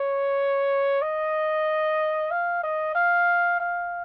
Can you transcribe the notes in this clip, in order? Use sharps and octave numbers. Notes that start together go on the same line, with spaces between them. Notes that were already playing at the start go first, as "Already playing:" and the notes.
Already playing: C#5
D#5
F5
D#5
F5
F5